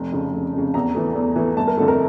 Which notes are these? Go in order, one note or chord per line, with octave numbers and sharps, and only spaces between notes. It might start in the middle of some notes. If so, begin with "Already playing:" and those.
Already playing: F1 A#5
F2 C#3
F1
F2 C#3
E2 A#5
E3 A3
E2
E3 A3
G1 A5
A#4
F2 D3 A3 A4
A#4